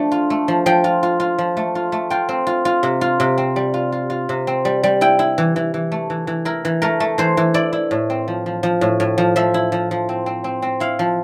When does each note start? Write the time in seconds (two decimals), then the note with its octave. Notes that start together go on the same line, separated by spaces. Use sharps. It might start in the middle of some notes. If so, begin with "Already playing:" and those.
Already playing: F3 A3 D4
0.12 F4
0.30 A3
0.48 F3
0.66 F3 G5
0.84 F4
1.03 F4
1.20 F4
1.38 F3
1.57 A3
1.75 F4
1.92 A3
2.10 F4 G5
2.29 C4
2.47 F4
2.65 F4
2.83 C3
3.01 F4
3.20 C3
3.38 C4
3.56 G3
3.74 F4
3.92 F4
4.10 F4
4.29 C3
4.47 C4
4.65 G3
4.83 G3
5.01 E4 G5
5.19 E4
5.38 E3
5.56 E3
5.74 E3
5.92 A3
6.10 E3
6.27 E3
6.45 E4 A#4
6.65 E3
6.82 A3 A#4
7.00 A3
7.18 E3 C5
7.37 E3
7.54 E4 D5
7.73 E4
7.91 A2
8.10 C4
8.28 F3
8.46 F3
8.63 F3
8.81 A2
9.00 A2
9.18 F3
9.36 F3 E5
9.54 E4
9.72 F3
9.91 F3
10.09 C4
10.26 C4
10.44 C4
10.62 C4
10.80 E4 F5
10.99 F3